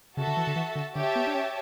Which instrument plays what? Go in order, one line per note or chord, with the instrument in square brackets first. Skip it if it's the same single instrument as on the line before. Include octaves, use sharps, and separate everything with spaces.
[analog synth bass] C#3 [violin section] F#4 A4 E5 A5
[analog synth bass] D3
E3
D3
E3
D3
[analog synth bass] D3 [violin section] G4 C#5 E5 A5
[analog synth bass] B3
D4
C#4